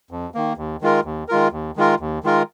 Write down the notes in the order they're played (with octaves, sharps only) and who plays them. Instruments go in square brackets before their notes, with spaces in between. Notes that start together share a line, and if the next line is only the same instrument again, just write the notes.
[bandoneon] F2
D#3 A#3
D#2
D#3 G#3 F4 A#4
D#2
D#3 G#3 F4 A#4
D#2
D#3 G#3 F4 A#4
D#2
D#3 G#3 F4 A#4